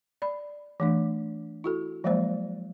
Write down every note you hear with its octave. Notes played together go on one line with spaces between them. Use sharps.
D5 B5
E3 A3 D4
E4 F#4 A4
F3 F#3 G#3 A#3 C5 D5